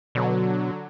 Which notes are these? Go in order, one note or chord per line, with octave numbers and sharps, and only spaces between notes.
B2 D3 F#3